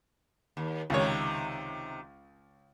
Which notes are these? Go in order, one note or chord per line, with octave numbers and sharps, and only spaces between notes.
D#2
C#2 C3 D#3 C#5